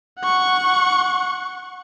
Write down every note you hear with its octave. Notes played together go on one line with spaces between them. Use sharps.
F#5 C#6